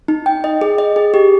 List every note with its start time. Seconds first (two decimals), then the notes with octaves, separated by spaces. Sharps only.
0.08 D#4
0.26 G5
0.44 D#5
0.61 G#4
0.78 D#5
0.96 G#4
1.14 G4